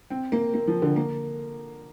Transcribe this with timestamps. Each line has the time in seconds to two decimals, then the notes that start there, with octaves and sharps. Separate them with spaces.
0.10 C4
0.32 A#3
0.54 A#3
0.67 F3
0.82 D3
0.96 A#3